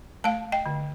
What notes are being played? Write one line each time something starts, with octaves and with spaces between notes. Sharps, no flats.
A3 F5 A5
D#5 G5
D3